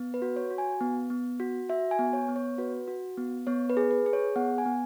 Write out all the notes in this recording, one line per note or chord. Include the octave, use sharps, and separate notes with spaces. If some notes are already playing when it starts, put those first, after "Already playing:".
Already playing: B3
B4
F#4
C#5
F#4
G#5
B3
B3
F#4
F#4 E5
G#5
B3
C#5
B3
C#5
F#4 B4
F#4
B3
B3 C#5
B4
G#4
B4
G#4
C#5
B3 F#5
G#5
B3